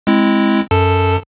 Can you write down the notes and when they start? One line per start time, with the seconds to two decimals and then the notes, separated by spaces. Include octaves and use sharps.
0.07 G#3 C4 E4
0.71 F#2 A4 A5